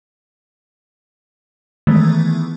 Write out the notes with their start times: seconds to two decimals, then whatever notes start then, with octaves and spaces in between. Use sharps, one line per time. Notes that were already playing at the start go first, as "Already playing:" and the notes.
1.87 D#3 E3 G#3 A3 B3